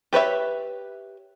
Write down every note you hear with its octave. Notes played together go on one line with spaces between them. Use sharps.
G4 B4 C#5 E5